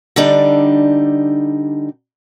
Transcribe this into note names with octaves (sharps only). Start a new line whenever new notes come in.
D3 G3 D4 D#4